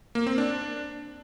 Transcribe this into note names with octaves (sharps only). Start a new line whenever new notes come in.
A#3
C4
D4